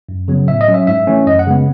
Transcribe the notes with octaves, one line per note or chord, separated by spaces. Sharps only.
F#2
C#3 F#3 B3
A2 E5
D#5
F#3 C#4
E5
G#2 E5
E3 A3 C#4
F#2 D#5
F#5
C#3 G#3 B3